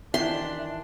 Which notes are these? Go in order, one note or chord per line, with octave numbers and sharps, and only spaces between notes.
D#3 E3 D4 E5 C6